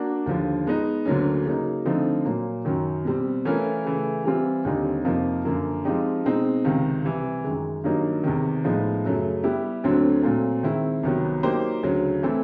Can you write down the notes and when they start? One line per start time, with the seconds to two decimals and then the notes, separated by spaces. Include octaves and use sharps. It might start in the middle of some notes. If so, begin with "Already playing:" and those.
Already playing: A#3 D4 F#4
0.26 D#2 D3 F3
0.66 G#3 B3 D#4
1.05 D2 D3 F#3 A#3 C#4
1.45 C#3 F#3 A#3 D#4
1.85 D3 F3 A3 C4 D#4
2.25 A#2 F#3 A#3
2.65 F#2 D#3 F#3
3.05 B2 G3 C4
3.45 E3 A3 C#4 F4 A#4
3.85 C#3 E3 A3
4.25 E3 G3 C4 F4
4.65 D#2 D3 G3 C4 D#4
5.04 F2 C3 F3 A#3 D#4
5.45 F#2 D3 F3 A#3
5.84 F3 G#3 C4 D#4 G4
6.25 B2 G#3 C4 D#4
6.64 C#2 C3 D#3
7.04 C3 E3 G3
7.44 F#2 D#3 G#3
7.84 G2 D#3 F#3 A#3 D#4
8.23 E2 C3 D#3
8.64 A2 F3 G#3 B3 D#4
9.04 F#2 C#3 F#3 A3
9.44 G3 B3 E4 G4
9.84 D2 D3 F#3 A3 C4
10.23 A#2 F#3 A3 C4
10.63 D#3 G#3 C4 E4
11.03 C2 C3 D#3 F#3 B3
11.43 F#3 A#3 D#4 G4 C5
11.83 D2 C#3 F#3
12.23 E3 A3 C4 E4